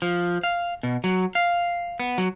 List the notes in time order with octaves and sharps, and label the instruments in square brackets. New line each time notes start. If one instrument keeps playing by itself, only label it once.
[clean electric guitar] F3
F5
B2
F#3
F5
B3
F#3